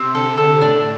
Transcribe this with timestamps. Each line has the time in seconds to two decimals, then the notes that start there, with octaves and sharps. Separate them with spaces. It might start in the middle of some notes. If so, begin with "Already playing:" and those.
Already playing: C3 C4
0.15 D3 A4
0.38 A4
0.61 A2 D4